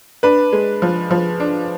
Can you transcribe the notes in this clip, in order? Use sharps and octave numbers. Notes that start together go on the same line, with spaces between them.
D4 B4
G#3
F3
F3
D4